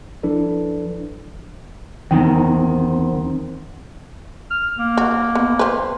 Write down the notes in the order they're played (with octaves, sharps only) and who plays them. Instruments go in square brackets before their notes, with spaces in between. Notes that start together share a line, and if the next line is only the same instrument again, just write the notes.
[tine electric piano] F3 D4 E4 A4 B4
[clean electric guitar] E2 D#3 [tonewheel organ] C4
[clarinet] F6
A#3
[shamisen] F#4
B3
C4 B4